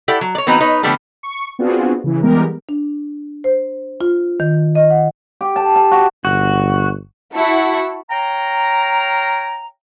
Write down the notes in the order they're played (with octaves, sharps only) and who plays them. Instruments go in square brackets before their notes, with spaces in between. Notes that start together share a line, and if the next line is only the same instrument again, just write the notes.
[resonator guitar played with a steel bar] E4 G4 A4 D5 F#5
F#3
C#5 D5
E3 B3 C4 D#4 F#4 B4
D#4 B4 C#5
D3 F3 G3 A3 B3 D4
[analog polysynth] C#6
B3 C4 D4 F4 F#4 G#4
C#3 E3
E3 G3 G#3 B3 G4 A#4
[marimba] D4
C5
F4
D#3
D#5
F#5
[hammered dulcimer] G4
A5
A5
F#4
[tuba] G1 [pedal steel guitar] F#4
[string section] E4 F#4 F#5 A5 B5 C#6
[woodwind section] C#5 F5 G5 A#5